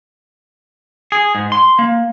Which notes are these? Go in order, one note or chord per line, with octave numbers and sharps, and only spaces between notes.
G#4
G#2
C6
A#3